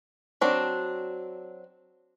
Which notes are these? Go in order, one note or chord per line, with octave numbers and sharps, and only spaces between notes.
F#3 C4 D4